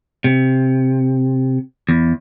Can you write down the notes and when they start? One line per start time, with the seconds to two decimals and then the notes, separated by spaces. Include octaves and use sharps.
0.24 C3
1.89 E2